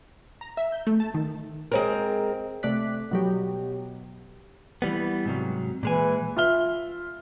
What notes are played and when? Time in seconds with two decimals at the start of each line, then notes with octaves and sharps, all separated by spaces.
0.41 A#5
0.57 E5
0.72 G6
0.87 A3
1.00 A5
1.14 D#3
1.72 G#3 C4 A#4
2.63 C3 A3 D5 D6 F#6 B6
3.11 B2 F#3 G4
4.82 E3 G3 B3
5.26 G#2 C3 F#3
5.83 A#2 E3 G#3 G#5
6.37 F4 E5 F6 G7